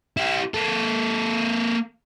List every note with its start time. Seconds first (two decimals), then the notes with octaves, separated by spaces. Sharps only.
0.17 E4 G4
0.54 A#3 A4